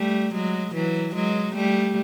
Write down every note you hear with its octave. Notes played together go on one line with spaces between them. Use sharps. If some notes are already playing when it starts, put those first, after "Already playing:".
Already playing: G3 A3
F#3 G#3
E3 F#3
F#3 G#3
G3 A3